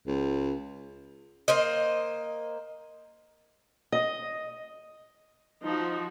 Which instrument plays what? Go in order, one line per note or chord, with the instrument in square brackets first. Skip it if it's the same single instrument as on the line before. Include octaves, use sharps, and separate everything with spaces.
[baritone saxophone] C#2
[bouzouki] A#3 C5 D#5
[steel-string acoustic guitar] D#5
[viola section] F3 F#4 [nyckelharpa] D#4